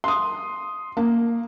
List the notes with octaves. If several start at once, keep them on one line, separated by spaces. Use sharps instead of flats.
C6 D#6
A#3